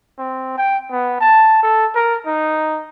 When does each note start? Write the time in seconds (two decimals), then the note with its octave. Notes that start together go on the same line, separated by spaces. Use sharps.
0.18 C4
0.57 G5
0.91 B3
1.20 A5
1.63 A4
1.95 A#4
2.26 D#4